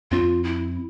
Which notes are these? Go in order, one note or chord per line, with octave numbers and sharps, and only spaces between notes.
F2 C4 F4
E4